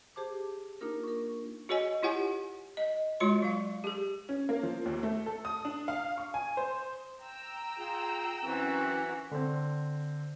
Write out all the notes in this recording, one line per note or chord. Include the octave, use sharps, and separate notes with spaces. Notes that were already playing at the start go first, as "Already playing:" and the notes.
G4 G#4 C5 A5 D6
A#3 D4 D#4 F4 A#4
A#4 C#6
F#4 G#4 C#5 D#5 G#5
E4 F4 G4 C#5 F#5 G#5
D#5
G#3 F4 F#4 C#5 C6
F#3 F5
G4 G#4
C#4
A#3
F3
D#2
A3
A4
D#6
D4
F5
C#6
G#5
C5
G5 A#5 E6
F4 G#4
F#2 E3 C4 F#4
D3 C4